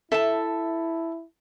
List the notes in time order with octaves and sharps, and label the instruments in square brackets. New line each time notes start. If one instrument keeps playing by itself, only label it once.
[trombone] E4 [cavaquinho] A4 [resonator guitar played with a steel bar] E5 A5